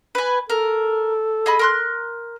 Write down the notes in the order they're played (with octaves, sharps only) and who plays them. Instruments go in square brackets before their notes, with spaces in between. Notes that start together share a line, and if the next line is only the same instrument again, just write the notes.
[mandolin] B4 G#5
[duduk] A4 [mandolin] A#4
[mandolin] G#4 D#5 B5
A#4 C6 F#6